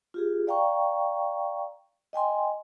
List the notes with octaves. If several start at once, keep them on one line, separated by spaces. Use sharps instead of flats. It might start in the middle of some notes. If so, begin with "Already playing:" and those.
F4 G4 G#4
D5 F5 G5 A#5 C#6
D#5 G5 G#5 C6